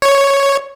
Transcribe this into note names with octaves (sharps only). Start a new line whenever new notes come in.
C#5